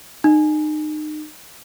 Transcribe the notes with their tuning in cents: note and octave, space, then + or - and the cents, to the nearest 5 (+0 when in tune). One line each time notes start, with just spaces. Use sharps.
D#4 -30